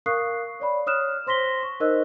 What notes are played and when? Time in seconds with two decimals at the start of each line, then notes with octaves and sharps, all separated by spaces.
0.06 A#4 F5 C#6 D#6 F#6 C7
0.60 C#5 D5 B5
0.87 C#5 D#6 F6 F#6 E7
1.27 C5 C6 A#6 B6 G7
1.63 C#6
1.80 D#4 A#4 C5 D#5 E6 F#6